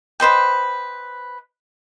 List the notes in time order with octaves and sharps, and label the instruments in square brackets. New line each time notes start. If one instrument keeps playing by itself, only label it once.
[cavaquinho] B4 C5 D#5 G5